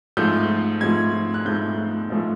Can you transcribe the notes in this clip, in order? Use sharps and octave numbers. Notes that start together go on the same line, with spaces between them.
G#2 F3 A3 G6
G#2 F3 A3 G#6
F#6
G#2 F3 A3 G6
G#2 F3 A3